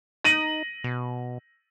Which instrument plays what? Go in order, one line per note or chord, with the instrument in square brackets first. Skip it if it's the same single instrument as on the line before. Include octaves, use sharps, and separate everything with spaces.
[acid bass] D#4 [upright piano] A#6 D#7 F#7
[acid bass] B2